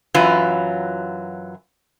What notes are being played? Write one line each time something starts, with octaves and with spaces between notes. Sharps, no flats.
F#2 E3 F#3 F4 B4